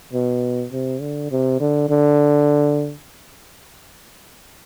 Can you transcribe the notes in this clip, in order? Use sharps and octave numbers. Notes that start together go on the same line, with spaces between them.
B2
C3
D3
C3
D3
D3